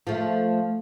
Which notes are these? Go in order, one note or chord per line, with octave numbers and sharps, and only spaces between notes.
F3 A3